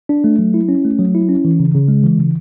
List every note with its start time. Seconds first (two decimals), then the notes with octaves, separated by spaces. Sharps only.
0.09 D4
0.24 A3
0.39 F#3
0.54 E4
0.69 C#4
0.85 A3
0.99 F#3
1.15 E4
1.29 C#4
1.45 E3
1.60 C#3
1.75 C#3
1.88 G#3
2.04 E3
2.19 C#3